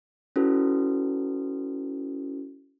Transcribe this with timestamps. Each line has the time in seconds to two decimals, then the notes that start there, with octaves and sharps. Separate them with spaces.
0.36 C#4 E4 F#4 A4 B4